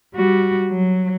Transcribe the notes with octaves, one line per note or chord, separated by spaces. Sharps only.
G3 F#4
F#3